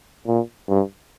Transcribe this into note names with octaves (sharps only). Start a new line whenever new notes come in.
A#2
G2